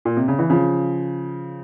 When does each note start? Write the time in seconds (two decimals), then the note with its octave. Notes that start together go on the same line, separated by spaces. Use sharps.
0.05 A#2
0.17 C3
0.28 C#3
0.39 E3
0.50 C#3 F3